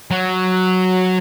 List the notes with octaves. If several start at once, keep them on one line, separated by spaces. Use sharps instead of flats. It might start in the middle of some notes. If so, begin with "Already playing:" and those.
F#3